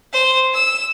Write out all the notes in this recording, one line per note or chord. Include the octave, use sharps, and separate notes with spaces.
C5
E6